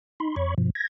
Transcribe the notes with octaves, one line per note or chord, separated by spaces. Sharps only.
D#4 B5 C6
F2 C#5 B5 C#6
G2 B2 F3
G#6 A#6